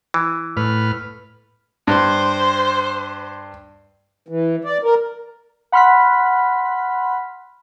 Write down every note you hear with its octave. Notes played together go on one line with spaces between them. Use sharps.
E3
A2 B4 F6
G2 C5
E3
D5
A#4
F#5 B5 C6 F6 F#6 B6